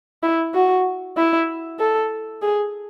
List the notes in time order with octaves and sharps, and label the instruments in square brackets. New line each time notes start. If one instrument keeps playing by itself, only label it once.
[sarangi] E4
F#4
E4
A4
G#4